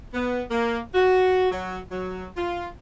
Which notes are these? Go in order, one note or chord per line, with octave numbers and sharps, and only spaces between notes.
B3
A#3
F#4
F#3
F#3
F4